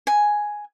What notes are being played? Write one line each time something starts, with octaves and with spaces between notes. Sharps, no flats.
G#5